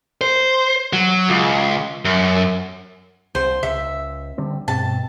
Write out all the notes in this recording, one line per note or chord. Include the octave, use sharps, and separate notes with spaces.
C5
F#3
C#2
F#2
C2 C5
C#2 E5
D3 G3 C4
G2 B2 C4 A5